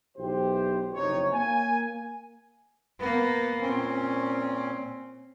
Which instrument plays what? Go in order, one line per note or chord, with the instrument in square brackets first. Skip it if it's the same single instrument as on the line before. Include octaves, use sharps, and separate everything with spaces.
[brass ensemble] B1 E3 G4 C5
F#1 F2 C3 D#4 C#5
A#3 G#5
[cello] A#3 B3
[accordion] A#2 C#4 [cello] C4